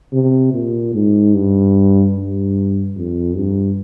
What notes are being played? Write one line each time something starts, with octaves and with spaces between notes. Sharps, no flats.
C3
A#2
G#2
G2
G2
F2
G2